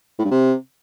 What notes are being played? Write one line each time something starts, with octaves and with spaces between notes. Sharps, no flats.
A2
G2
C3